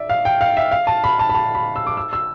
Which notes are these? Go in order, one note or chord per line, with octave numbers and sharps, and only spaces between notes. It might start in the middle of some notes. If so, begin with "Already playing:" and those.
Already playing: D5 E5
F5
G5
F5
E5
F5
A5
B5
A5
B5
A5
B5
E6
D6
E6
E6